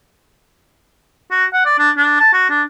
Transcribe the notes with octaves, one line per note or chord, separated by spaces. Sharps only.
F#4
F#5
D5
D4
D4
A5
F#4
D4